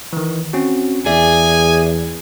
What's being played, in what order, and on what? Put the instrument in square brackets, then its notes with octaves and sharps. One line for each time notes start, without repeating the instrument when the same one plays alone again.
[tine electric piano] D#3 E3
C4 C#4 F#4
[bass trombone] E2 [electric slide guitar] G#4 [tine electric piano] D5 E5 [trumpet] G#5